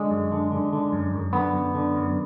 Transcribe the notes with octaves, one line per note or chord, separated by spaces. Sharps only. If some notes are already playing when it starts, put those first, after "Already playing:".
Already playing: D3 G#3
F#2
D3
D3
D3
F#2
F#2
D3 B3
F#2
D3
F#2